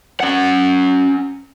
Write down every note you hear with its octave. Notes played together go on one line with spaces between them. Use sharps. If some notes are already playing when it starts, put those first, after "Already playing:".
C#4 F#5